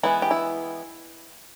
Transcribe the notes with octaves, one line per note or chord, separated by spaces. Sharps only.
E3 G#3 B3 E4
G4
E4